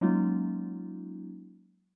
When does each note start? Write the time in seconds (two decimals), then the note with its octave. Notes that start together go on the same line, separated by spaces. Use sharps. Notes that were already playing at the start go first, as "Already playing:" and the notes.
0.01 F#3 G#3 A#3 C#4 D#4 F4